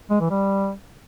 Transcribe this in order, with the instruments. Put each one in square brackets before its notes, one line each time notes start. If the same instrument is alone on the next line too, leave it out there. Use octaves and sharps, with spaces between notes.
[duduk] G#3
E3
G3